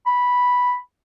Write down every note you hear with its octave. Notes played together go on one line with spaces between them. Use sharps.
B5